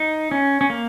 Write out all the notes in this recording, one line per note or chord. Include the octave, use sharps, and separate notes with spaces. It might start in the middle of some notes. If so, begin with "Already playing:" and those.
Already playing: D#4
C#4
C#4
A#3